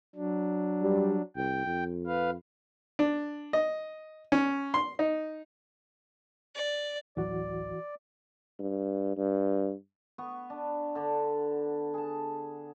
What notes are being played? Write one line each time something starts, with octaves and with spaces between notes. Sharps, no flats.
F#3 D4
G3
C2 G5
F2
B4 F5
D4
D#5
C#4
C6
D#4
D5
D1 A1 E3 F#3 F#4 D5
G2
G2
B3 B4 C#6
D4
D3 D4
G#4 A5